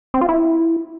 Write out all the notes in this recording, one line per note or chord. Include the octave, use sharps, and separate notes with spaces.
C4
F4
E4